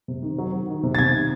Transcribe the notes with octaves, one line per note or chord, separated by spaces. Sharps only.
C3
D#3
F#3
F#3
D#3
C3
A6
C3 G#6
D#3